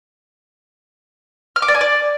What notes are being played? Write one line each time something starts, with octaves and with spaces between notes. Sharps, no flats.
F6
D6
D5
G#5
D5